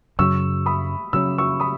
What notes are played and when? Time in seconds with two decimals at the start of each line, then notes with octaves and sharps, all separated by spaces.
0.19 F#2 C#3 F#3 C#4 C#6 E6
0.66 B5 D#6
1.13 C#3 F#3 C#4 E6
1.38 C#6 E6
1.60 B5 D#6